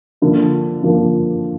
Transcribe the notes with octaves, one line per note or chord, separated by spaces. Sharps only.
D3 F3 A#3
D3 F3 A#3